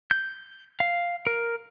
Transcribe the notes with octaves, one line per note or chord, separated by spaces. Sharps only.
G6
F5
A#4